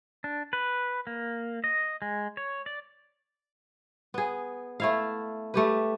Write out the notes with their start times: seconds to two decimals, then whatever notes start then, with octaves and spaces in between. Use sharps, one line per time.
0.24 D4
0.53 B4
1.07 A#3
1.64 D#5
2.02 G#3
2.37 C#5
2.66 D5
4.14 B3 G#4
4.80 A3 E4 F5
5.54 A3 G4 B4